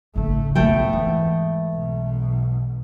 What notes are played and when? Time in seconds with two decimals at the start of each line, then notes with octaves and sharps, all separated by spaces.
0.16 G#1 C#3 A3
0.55 B1 F2 G#2 A3 B3 B4 G5
0.93 E3 G#3
1.71 B1 B2